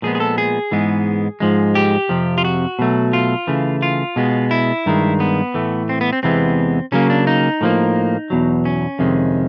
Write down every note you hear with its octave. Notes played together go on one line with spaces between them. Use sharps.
A#2 F3 G#3 B3 G#4
G#4
A4
G#4
G#2 E3 G#3 B3
G#2 F3 G#3
G4
F2 C3 F3
F4
F#4
B2 F#3 A3
F4
C#3 E3 A3
F4
B2 G#3 B3
E4
G2 D#3 G#3
B3
A2 E3 A3
C4
B3
C4
E2 C3 E3 G#3 B3 C4
C#3 F#3 A#3 C#4
D4
D#4
A2 F3 A#3
E2 B2 F#3
C#4
F2 C3 D#3 G#3